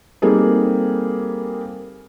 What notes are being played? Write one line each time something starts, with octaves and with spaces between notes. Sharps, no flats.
G3 A#3 C4 D#4 G#4 A4